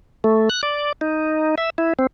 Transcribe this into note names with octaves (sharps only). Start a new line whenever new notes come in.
A3
F#6
D5
D#4
E5
E4
C4